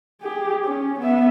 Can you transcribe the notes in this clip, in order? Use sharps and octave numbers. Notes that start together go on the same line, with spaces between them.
G4 G#4
C#4
B3 E5